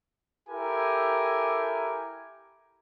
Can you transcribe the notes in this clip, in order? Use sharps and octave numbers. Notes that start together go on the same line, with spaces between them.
E4 G4 A4 A#4 G#5